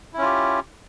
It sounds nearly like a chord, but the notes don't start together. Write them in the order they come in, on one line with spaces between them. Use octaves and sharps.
E4 C#4 F4 G4